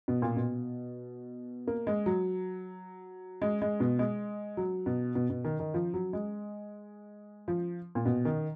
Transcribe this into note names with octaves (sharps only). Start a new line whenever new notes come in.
B2
A#2
B2
A#3
G#3
F#3
G#3
G#3
B2
G#3
F#3
B2
B2
B2
D#3
D#3
F3
F#3
G#3
F3
A#2
B2
D#3